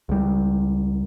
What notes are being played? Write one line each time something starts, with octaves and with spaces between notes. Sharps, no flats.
C#2 G3